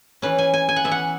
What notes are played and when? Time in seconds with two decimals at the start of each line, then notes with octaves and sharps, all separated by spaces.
0.22 E3 C#4 B4
0.38 G#5
0.54 G#5
0.69 G#5
0.76 F#5
0.84 E3 B3 E5
0.92 F#5